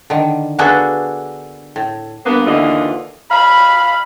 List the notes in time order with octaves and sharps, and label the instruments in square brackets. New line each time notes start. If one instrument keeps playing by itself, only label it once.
[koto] D3 D#3
A#3 B3 D4 F#4 G#4 A4
A2
[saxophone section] G2 A#3 B3
D#2 D3 E3 F4 D#5
[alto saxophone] F5 [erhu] B5